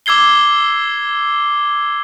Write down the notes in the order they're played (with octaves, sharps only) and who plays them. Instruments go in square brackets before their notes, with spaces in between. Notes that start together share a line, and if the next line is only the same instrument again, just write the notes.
[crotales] D6 E6 G#6 C7 G7